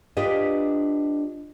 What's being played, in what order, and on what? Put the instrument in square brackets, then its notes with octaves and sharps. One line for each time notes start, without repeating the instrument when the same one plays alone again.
[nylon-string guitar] D4 F4 G4 B4 D5 D#5